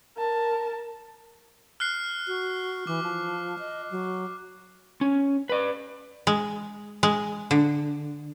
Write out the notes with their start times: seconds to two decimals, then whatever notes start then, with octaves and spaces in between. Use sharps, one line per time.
0.17 A#4 A5
1.80 F6 F#6 C7
2.27 F#4
2.87 E3 D6
3.03 F3
3.59 D#5
3.91 F#3
5.01 C#4
5.49 B4 D5
6.27 G#3
7.03 G#3
7.51 D3